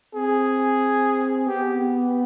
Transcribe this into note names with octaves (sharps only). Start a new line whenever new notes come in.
C4 G#4
B3 G4